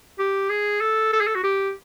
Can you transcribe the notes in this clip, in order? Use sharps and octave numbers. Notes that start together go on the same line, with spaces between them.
G4
G#4
A4
A4
G#4
A4
F#4
G4